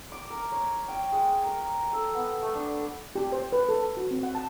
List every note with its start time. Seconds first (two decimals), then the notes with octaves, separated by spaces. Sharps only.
0.12 D6
0.30 A#4
0.52 C#5
0.88 G5
1.12 G#3
1.44 A#4
1.93 A4
2.15 B3
2.42 A3
2.55 D4
3.16 G4
3.32 C5
3.52 B4
3.69 A4
3.97 F#4
4.11 C4
4.23 F#5
4.35 A5